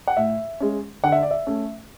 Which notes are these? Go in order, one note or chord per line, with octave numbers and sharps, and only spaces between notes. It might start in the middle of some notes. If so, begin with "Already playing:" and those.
F#5
A2 E5
G#3 C#4
D3 F#5
E5
D5
E5
A3 C#4